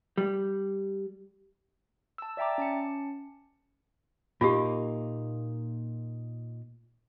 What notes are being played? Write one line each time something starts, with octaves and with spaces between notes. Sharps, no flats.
G3
A5 E6
D5 E5 G5 A#5 D6
C#4 A5 C#7
A#2 A#3 D#4 F4 G4